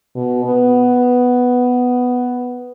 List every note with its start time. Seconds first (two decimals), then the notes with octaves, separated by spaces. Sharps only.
0.15 B2
0.45 B3